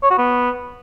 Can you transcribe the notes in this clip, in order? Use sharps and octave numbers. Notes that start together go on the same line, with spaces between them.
C#5
F#4
B3